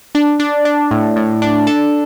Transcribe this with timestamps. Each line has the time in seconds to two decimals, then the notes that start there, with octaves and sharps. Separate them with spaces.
0.15 D4
0.40 D4
0.65 D4
0.91 A2
1.16 A2
1.42 D4
1.67 A4